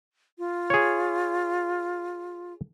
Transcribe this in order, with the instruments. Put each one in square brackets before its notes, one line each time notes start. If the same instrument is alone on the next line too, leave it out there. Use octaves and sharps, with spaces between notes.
[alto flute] F4
[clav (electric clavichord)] G#4 C#5